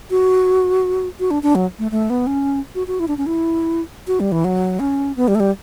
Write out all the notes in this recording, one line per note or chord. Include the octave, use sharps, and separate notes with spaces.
F#4
F#4
D4
D4
F#3
A3
A3
B3
C#4
F#4
F#4
E4
D4
C#4
E4
F#4
G3
E3
F#3
C#4
B3
G3
A3
G3